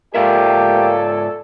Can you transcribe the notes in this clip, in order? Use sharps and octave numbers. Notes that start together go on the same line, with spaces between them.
G#2 A#3 F4 G4 A4 D5 E5 G#5